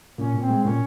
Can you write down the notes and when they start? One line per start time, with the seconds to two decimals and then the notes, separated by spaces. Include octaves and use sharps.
0.18 A#2 C#4
0.34 A#2
0.41 C4
0.49 G#3
0.65 A#2 C#4